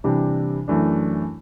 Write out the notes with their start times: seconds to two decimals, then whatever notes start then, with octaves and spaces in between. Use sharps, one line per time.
0.04 C3 E3 G3 D4 G4
0.68 F#2 E3 A3 D4